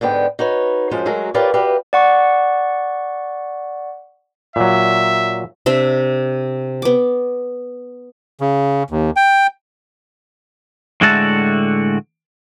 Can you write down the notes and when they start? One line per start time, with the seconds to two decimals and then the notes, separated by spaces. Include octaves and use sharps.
0.01 G#2 D3 B3 G5
0.39 D#4 F#4 B4 C#5
0.91 F#2 F3 G#3 C#4 C5
1.06 F#3 G#3 A3 F#4 A#4
1.34 F4 G4 A#4 B4 C#5 D5
1.54 F#4 G4 B4 E5 F5
1.93 D5 F#5 C#6
4.56 A#2 F#3 E5
5.66 C3 D4 E5
6.82 B3 D6
8.41 C#3
8.90 D#2
9.16 G5
11.01 A2 D3 G#3 F#4 E5 A5